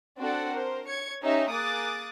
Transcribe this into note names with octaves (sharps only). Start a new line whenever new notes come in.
C4 D4 F#4 A4 D5 F#5
A#4 C5
C#5 G#6 C#7
C#4 D#4 G4 E5
A#3 G#4 D6 D#6 F#6 A6